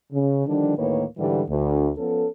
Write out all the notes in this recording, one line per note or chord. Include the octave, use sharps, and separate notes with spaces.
C#3
D3 D#3 F3 G3 D4
D2 A2 D#3 A#3 B4 C#5
G#2 D3 E3 G3
D2
F3 B3 C#4 A4